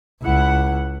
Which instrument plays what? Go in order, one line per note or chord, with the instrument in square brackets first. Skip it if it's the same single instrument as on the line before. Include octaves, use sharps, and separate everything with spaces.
[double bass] C#2 [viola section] E4 F#5